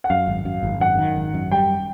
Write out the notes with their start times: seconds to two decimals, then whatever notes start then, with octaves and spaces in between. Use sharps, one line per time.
0.04 F#5
0.10 F#2 F5
0.28 G#1
0.45 F#2
0.63 G#1
0.80 F#2 F#5
0.99 D#3
1.16 G#1
1.34 F#2
1.51 G3 G5